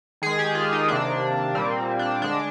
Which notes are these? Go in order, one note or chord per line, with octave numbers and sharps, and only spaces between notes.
D#3 G#3 G#4
G4
F4
D#4
C3 D#3 A#3 D4
A#2 G3 A#3 C4
D4
D3 G#3 D4